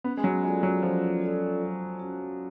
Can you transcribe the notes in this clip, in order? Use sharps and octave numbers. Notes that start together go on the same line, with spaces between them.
B3 C#4
G#3
F#3
G#3 F4 A4 D5
F#3
F3 C#4
F4 A4 D5
F#3
C#4 F#4